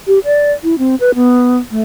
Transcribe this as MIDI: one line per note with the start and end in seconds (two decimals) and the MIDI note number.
0.07 0.19 67
0.25 0.52 74
0.63 0.75 64
0.78 0.95 60
1.00 1.11 71
1.15 1.58 59
1.71 1.83 57